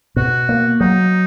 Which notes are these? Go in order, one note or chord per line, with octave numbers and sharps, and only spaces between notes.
B2 F#4
A#3
F#3 D#4